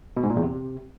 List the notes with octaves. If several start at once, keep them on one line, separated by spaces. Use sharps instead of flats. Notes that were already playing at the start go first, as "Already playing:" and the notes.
B2
G#2
A#2
E2
C3